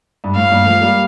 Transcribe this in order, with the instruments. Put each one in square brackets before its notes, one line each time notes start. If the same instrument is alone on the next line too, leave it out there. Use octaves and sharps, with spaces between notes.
[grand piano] G2
[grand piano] A2 [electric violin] F5
[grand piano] G2 A#2
F3 A3
G3 A#3